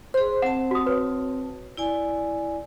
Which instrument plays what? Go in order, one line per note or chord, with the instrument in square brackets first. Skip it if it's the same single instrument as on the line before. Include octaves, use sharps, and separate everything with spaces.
[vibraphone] G#4 C6 [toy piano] C5
[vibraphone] C4 A5 [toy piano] F#5
[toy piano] F#4 D#6
B4 C#5
[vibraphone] E4 D5 G#5